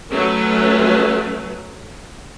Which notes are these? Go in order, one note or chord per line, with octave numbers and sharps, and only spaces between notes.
F#3 A3 C#4 B4